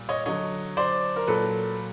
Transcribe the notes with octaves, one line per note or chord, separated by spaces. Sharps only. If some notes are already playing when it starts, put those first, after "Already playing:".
Already playing: A#2 G3
C#5 D#5
D3 F#3 C#5 D#5
C5 D5
A#4
A#2 F#3 A4 B4